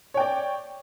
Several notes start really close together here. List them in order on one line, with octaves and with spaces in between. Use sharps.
C#5 G5 D5